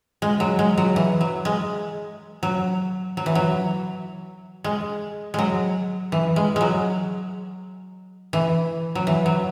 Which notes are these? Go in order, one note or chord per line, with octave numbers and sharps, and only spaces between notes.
G#3
F#3
G#3
F#3
E3
F#3
G#3
F#3
F#3
E3
F#3
G#3
F#3 G#3
E3
G#3
F#3 G#3
E3
F#3
E3
F#3